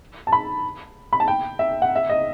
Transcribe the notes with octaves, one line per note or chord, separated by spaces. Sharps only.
A5
B5
B5
A5
G5
E5
F#5
E5
D#5